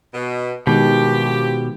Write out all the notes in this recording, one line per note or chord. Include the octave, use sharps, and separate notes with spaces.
B2
G2 B2 D#3 F3 G#3 G4